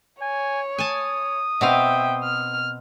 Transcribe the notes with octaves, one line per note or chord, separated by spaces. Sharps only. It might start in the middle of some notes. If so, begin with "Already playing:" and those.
C#5 G#5
G#5 A5 D#6
B2 C4 E5 F5 G5
F6